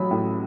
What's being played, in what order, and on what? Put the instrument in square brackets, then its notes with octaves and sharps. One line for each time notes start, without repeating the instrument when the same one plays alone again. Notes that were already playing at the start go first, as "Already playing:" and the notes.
Already playing: [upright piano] A1 F#3 B5
A2